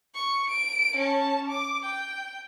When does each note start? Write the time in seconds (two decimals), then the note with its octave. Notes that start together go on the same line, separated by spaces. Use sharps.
0.15 C#6
0.50 D7
0.97 C#4 A5
1.49 D6
1.85 G5